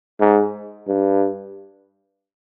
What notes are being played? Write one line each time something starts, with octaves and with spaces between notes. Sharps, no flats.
G#2
G2